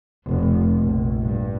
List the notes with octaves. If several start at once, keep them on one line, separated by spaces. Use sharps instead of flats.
F1
A#1
G2